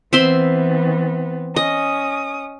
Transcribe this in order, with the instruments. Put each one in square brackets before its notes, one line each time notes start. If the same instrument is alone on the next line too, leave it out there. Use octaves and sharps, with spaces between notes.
[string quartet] E3 B3 [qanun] C4 E5 C6
[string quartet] C#4 D#6 [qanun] D#5